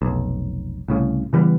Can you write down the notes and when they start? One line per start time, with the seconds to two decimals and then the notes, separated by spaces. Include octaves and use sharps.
0.02 F1 B1
0.88 C2 A2 C#3
1.33 C#3 E3 G3 B3